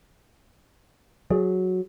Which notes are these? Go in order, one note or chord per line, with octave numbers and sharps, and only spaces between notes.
F#3 G#4